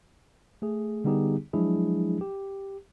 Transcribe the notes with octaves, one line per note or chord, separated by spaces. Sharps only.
A3 G#4
D3 G3 B3 D#4 G4 G#4
F3 F#3 G#3 D4 E4 G#4
G4